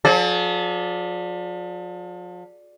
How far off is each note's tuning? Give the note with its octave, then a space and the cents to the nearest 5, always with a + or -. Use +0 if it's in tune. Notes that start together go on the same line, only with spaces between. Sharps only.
F3 +40 G#4 +45 D5 +0